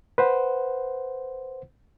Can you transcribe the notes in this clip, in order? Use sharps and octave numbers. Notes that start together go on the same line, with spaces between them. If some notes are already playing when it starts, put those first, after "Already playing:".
B4 C5 F#5